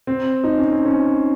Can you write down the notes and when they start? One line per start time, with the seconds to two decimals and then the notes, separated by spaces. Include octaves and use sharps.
0.07 C4
0.44 D#4
0.58 C#4
0.72 C4
0.85 C#4